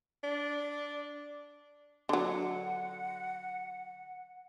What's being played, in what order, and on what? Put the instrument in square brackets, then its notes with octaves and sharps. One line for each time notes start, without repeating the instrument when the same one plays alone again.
[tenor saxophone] D4
[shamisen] D3 F#3 [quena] F#5